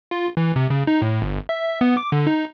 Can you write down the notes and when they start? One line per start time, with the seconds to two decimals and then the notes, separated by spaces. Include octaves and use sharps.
0.11 F4
0.37 E3
0.56 C3
0.70 C#3
0.87 D#4
1.02 A2
1.22 G1
1.49 E5
1.81 B3
1.97 D6
2.12 D3
2.27 D#4